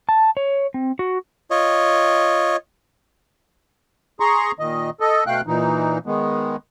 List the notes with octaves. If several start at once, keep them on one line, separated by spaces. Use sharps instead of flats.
A5
C#5
C4
F#4
F4 C#5 D#5
G#4 A#5 C6 C#6
A#2 D#3 D#5
A4 D#5
B2 A3 F5 G5 F#6
A#2 E3 D#4
D#3 G#3 B3